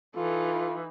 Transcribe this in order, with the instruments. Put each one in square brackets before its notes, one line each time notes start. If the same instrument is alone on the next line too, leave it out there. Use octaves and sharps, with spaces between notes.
[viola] E3 D#4 [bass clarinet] F4 [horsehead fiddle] A4